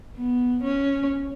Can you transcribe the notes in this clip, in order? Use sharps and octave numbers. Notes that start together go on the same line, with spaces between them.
B3
C#4